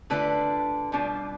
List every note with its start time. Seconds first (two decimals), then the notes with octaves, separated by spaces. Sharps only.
0.10 D3 A3 D4 F4 B4
0.92 B2 G3 D4 F4